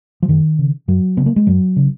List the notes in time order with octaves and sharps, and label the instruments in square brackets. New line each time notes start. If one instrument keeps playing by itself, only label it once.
[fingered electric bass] F3
F#2 D#3
C#3
F#2 F#3
C#3 B3
A#3
G#3
F#2 F#3
C#3